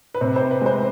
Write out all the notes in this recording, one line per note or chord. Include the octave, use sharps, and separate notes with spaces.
B4
C3 C5
C4 C5
B4
G#3 C5